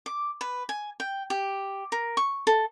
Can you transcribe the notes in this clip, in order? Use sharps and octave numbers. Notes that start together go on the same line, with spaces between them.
D6
B4
G#5
G5
G4
A#4
C#6
A4